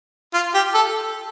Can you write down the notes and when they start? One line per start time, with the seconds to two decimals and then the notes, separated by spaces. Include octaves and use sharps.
0.34 F4
0.54 G4
0.74 A4